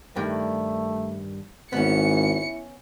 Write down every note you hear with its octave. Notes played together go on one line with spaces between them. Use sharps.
G2 D#3 A3
G#1 B3 C#4 E4 C#7